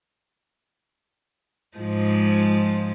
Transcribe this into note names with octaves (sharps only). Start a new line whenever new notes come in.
G#2 F3 G#3